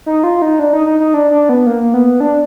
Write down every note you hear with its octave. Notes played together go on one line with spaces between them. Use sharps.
D#4
F4
D#4
D4
D#4
D#4
D#4
D4
D4
B3
A#3
B3
D4